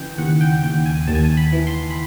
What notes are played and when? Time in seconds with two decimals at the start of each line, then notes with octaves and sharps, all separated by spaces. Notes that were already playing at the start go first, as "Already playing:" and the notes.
Already playing: C#3 E3 G5
0.18 D#2 F#5
0.41 G5
0.63 D#2 G5
0.86 G#5
1.07 D#2 A5
1.15 G#5
1.22 A5
1.37 B5
1.53 E3
1.67 C6
1.91 B5